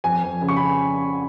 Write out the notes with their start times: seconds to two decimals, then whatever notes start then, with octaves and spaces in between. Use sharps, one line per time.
0.04 F2 G#5
0.24 F2
0.42 C#3
0.49 C#6
0.56 B5